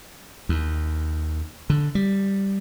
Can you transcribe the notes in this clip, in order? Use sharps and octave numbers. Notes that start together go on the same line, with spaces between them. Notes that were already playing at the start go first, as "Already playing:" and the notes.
D#2
D3
G3